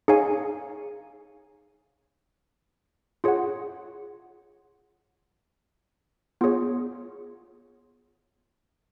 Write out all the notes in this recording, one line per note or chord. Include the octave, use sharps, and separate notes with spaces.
D#4 G#4 C#5 F5 G#5
F4 G#4 C#5 F#5
B3 F4 G#4 C#5